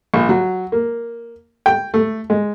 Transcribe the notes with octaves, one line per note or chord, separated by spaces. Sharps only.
A#1
F#3
A#3
G5
A3
G#3